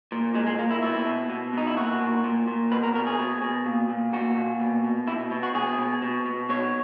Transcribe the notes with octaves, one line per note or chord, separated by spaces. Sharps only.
A#2
A#2 G#3
G#3
A#2 A#3
E4
B2 E4
B2
B2
B2 D#4
E4
A#2 F#4
A#2
A#2
A#2
B2 B4
A#4
B2 A#4
G#4
B2
B2
A#2
A#2
A#2 F#4
A#2
B2
B2
B2 E4
B2
F#4
B2 G#4
B2
B2
B2
B2 C#5